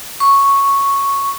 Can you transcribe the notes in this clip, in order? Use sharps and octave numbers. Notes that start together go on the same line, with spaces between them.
C#6